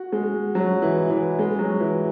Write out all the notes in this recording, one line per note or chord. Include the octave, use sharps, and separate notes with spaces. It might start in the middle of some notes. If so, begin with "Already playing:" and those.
Already playing: F#4
G#3
F#3
E3
E3
G#3
F#3
E3